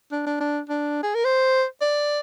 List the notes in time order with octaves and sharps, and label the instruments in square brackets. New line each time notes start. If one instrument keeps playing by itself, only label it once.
[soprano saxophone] D4
D4
D4
D4
G#4
A#4
C5
D5